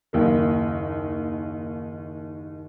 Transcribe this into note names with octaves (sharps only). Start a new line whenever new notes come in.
F#1 D#2 A#3